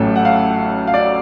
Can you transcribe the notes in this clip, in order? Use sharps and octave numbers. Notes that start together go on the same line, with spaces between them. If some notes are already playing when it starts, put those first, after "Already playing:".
Already playing: A1 A2 F#3 C#4 A4
F#5
F5
F5
D5